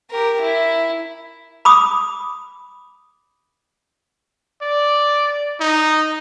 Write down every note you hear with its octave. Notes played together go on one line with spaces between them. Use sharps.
G4 A#4
E4
B5 D6 D#6
D5
D#4